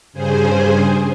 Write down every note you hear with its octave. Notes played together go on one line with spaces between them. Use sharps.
G2 C#3 G#4 C5 G#5